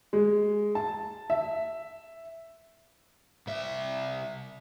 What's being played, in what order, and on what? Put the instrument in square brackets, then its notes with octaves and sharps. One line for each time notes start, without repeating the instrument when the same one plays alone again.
[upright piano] G#3
A5
E5
[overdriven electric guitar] C2 E5